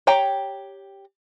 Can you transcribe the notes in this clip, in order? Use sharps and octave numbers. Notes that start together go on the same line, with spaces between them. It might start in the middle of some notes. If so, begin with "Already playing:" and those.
G4 C#5 G5 A#5